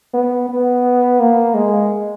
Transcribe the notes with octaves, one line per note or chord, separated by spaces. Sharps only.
B3
B3
A#3
G#3